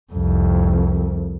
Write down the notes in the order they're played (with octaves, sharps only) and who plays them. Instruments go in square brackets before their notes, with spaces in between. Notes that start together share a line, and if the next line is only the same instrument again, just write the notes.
[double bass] C2 F2